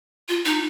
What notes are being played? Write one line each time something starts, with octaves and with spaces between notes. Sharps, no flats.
F4
D#4